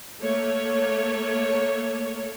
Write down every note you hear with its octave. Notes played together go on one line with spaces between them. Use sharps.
A3 A#3 C#5